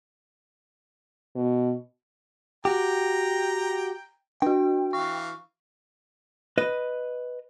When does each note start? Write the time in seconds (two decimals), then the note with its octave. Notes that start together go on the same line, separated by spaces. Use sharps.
1.35 B2
2.65 F#4 G4 G5 A#5
4.42 D4 F#4 G5
4.93 E3 F5 C#6
6.58 B4 D#5